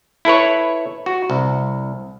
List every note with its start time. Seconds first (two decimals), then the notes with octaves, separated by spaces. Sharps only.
0.25 E4 A4 B4 C#5
1.06 F#4
1.30 C2